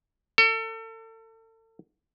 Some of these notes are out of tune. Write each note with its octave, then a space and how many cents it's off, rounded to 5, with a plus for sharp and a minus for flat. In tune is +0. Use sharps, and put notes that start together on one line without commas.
A4 +35